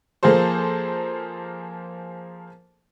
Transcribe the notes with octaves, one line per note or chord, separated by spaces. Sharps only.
F3 A#3 G#4 A4 C5